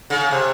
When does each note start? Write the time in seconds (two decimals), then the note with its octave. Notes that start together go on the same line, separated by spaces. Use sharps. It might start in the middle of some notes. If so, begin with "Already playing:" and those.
0.10 C#3
0.31 C3